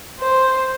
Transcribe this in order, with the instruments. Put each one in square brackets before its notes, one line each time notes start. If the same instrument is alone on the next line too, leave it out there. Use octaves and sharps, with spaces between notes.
[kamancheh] C5